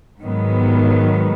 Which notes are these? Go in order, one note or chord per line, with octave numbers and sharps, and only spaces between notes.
G#2 D#3 F#3 B3